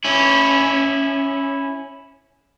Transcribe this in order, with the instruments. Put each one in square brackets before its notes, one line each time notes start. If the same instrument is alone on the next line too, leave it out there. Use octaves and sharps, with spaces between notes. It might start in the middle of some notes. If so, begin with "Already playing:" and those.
[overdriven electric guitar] C#4 E4